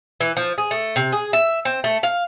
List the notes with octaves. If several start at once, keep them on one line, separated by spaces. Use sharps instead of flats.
E3
F3
G#4
A3
C3
G#4
E5
C4
A3
F5